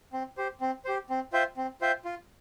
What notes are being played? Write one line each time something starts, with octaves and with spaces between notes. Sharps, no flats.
C4
G4 C5
C4
G4 C5
C4
F4 C5 E5 G5
C4
F4 C5 E5 G5
F4